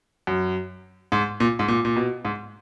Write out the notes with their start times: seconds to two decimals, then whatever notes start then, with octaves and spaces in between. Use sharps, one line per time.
0.27 F#2
1.12 G#2
1.40 A#2
1.59 G#2
1.68 A#2
1.85 A#2
1.96 B2
2.25 G#2